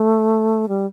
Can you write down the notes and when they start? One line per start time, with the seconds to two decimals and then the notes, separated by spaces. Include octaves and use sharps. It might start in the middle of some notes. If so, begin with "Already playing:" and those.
Already playing: A3
0.68 G3